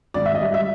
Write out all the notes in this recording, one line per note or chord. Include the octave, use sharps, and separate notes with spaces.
G#1 D5
E5
D#5
G3
E5